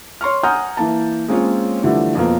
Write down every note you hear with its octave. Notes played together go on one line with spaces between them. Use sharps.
C#5 C6 C#6 F6
F#5 G#5 A#5 D#6 F6 G6
E3 A#3 A5
G#3 A#3 C4 C#4 F4 C#5
D3 E3 F3 G3 A3
F2 B2 A#3